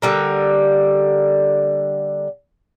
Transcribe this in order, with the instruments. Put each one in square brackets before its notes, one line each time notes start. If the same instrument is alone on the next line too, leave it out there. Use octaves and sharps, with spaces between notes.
[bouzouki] D3 G3 A#3